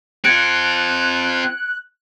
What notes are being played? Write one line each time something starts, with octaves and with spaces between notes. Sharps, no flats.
C4 F4 F#6 G#6 C#7 D7